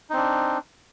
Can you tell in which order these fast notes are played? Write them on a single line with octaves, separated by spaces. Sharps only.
D#4 C4 D4